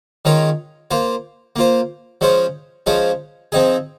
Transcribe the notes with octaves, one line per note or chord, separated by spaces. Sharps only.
D#3 G#3 C#4 F4 A#4
A#3 F4 C5
A#3 F4 C5
F3 G#3 C#4 F4 C5
F3 G#3 C#4 F4 C5
F3 C4 D#4 G#4